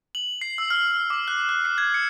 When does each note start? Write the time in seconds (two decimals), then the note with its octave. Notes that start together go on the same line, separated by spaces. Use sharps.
0.15 F#7
0.41 C7
0.58 E6
0.70 F6
1.10 D6
1.28 F#6
1.49 F#6
1.65 C7
1.78 G#6
1.94 C#7